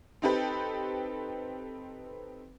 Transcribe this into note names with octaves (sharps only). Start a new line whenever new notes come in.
C4 D#4 G4 A4 B4 G5